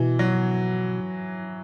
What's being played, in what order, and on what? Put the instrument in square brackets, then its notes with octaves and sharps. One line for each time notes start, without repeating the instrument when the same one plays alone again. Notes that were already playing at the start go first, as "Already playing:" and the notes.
Already playing: [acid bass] B2 [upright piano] E3
[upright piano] F#3